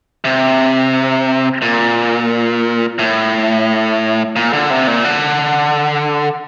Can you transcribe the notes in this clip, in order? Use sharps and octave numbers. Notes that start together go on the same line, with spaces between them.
C3
A#2
A2
A#2
D3
C3
A#2
D3